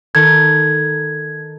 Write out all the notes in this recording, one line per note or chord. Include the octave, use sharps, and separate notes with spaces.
D#3 A4 G#6